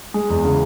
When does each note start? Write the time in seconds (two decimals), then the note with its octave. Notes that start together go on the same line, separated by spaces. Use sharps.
0.14 G#3
0.30 E2
0.44 C#3